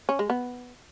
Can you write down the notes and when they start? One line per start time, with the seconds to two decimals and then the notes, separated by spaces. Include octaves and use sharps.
0.09 C#4
0.19 G#3
0.30 B3